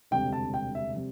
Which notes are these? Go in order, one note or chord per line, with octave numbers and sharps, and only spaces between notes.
E1 D2 C3 G3 C4 G5
A5
G5
E5
C3 G3 C4